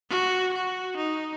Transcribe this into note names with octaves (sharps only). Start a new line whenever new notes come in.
F#4
F#4
D#4